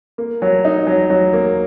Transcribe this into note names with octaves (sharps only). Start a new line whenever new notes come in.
A#3
F#3
D#4
F#3
F#3
A#3